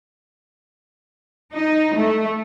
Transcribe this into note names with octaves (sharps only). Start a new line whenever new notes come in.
D#4
A3